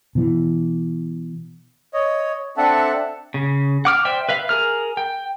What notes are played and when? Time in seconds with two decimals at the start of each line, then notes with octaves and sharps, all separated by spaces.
0.15 B2 E3
1.93 C#5 D#5
2.57 C4 D4 A4 E5 F#5 A5
3.34 C#3
3.85 F#5 D6 F6
4.05 C5 D5 E5 G5
4.29 B4 E5 F5
4.49 G#4 A#4 F6
4.97 G5